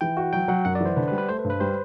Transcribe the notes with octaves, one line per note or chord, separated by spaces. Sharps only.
E3 G5
F#4
F#3 G5
F#3 F#5
F#2 F#5
D5
E3 C5
D3 B4
B4
G3
B4
A3 C5
B4
G2
B4
G3 C5